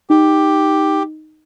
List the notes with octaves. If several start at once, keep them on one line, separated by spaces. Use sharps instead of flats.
D#4 G4